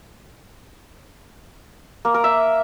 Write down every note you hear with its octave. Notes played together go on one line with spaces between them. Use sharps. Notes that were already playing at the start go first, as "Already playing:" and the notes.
A#3
A#4
E5